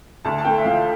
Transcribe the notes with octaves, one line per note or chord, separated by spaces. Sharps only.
D2 A5
A5
A3 G5
E5
F3 F5